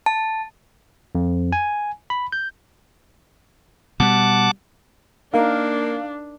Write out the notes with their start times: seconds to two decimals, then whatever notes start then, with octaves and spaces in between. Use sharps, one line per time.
0.06 A5
1.15 F2
1.52 G#5
2.10 B5
2.32 G6
4.00 B2 G3 F#5 A5 D6
5.34 A#3 D4 D#4 A#4 F5